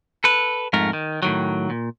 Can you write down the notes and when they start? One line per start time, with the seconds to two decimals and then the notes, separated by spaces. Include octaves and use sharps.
0.24 A4 B4
0.73 F2 G#2 A3 A#4
0.93 D#3
1.23 A2 D#3 F#3
1.70 A#2